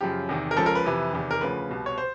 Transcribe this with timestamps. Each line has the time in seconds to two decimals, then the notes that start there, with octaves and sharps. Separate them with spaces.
0.01 F#2 C#3 F3 G4
0.29 E2 C3 D#3
0.51 A#4
0.57 C#2 C#3 F3 A4
0.66 A#4
0.75 B4
0.85 F2 C3 E3
1.13 E2 C3 D#3
1.31 A#4
1.41 D2 C#3 F3 B4
1.69 C2 B2
1.86 C#5
1.98 C5